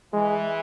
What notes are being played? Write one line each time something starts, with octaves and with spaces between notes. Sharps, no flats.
E3 G#3